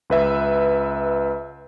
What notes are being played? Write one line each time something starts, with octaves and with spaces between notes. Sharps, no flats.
C#2 B4 E5